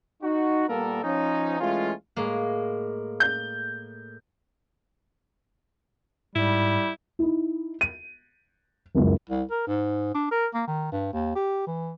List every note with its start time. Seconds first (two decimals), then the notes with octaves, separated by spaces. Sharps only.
0.23 D#4 F#4
0.69 A#2 G3 A#3 B3 A4 A#4
1.03 F3 C#4 D#4
1.60 E3 G#3 A3 C#4 F4
2.16 A2 G#3 A#3
3.20 G6
6.35 G#2 G3 E4
7.19 D#4 E4
7.81 D#7
8.95 F#1 C#2 F#2
9.30 C2
9.51 A#4
9.67 G#2
10.14 D4
10.31 A#4
10.54 A#3
10.67 D#3
10.92 G2
11.13 D#2
11.36 G4
11.67 E3